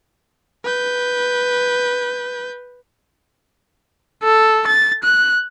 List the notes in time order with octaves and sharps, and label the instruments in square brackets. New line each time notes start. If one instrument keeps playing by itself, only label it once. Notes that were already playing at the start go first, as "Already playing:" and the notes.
[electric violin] B4 G6
A4
A6
F#6